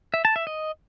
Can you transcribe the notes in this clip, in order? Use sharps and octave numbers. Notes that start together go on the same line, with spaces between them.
E5
A5
E5
D#5